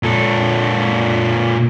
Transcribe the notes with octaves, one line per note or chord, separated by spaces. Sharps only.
A#2 A4